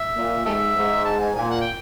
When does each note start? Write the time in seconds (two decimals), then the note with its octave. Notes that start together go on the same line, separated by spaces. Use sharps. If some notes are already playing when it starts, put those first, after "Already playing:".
Already playing: E5
0.16 A#2
0.46 G#2 G4 A4 E5
0.76 G#2
1.05 A5
1.20 G#5
1.35 A#2 G#5
1.50 F#5
1.61 G5